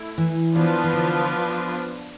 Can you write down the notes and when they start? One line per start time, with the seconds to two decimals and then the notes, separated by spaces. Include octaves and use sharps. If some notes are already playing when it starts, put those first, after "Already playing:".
Already playing: A3 E4
0.18 E3
0.55 E3 F3 B3 D4 F4 B4
0.84 E3
0.93 D3